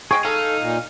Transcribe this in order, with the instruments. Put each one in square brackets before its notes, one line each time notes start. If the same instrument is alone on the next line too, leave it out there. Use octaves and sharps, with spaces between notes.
[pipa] G#3 G5 C#6 [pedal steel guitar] G#4
[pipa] G#3 [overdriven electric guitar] D#4 [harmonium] A4 [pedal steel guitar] F5
[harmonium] A#2